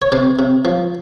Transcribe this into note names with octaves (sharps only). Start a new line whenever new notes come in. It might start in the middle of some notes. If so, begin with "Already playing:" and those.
C#5
C3 C5 D5
C3
F3